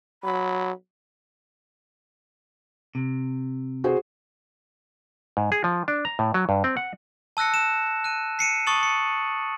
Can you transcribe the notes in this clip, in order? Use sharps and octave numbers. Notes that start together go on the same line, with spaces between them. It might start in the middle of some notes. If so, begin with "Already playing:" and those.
F#3 B5
C3
F#4 G#4 C5
G#2
G#4
F3
D4
A#5
A2
F#3
G2
C4
F#5
A5 E6 F#6 A#6 C#7
E7
F#6 D#7
C7 C#7 D#7 E7
A5 C#6 D#6 A6 F#7
C#7